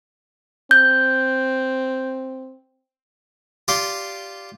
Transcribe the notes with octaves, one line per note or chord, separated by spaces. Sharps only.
C4 G6
F4 G4 D5 C6